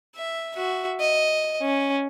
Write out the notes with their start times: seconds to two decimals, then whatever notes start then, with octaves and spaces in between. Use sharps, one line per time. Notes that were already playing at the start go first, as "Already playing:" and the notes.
0.17 E5
0.56 F#4 E5
1.00 D#5
1.61 C#4